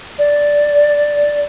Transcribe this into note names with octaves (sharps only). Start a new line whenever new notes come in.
D5